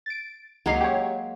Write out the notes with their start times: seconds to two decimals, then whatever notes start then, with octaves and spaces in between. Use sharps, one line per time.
0.06 A6 D7
0.66 C#2 F#3 G#3 A#3 D#4 C7
0.81 G4 C#5